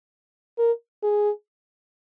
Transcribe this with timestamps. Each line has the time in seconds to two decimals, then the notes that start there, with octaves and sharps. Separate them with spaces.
0.58 A#4
1.03 G#4